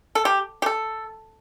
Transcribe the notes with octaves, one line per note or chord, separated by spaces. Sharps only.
A4
G4
G4
A4